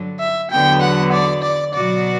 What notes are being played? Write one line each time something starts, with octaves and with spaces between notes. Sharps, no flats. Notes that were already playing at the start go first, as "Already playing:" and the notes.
Already playing: G2 D3 F#3
E5
E2 D3 F#3 B3 F#4 G5
F#5
D5
D5
B2 F#3 B3 F#4 D5